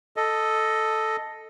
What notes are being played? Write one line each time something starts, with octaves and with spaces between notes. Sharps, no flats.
A4 D#5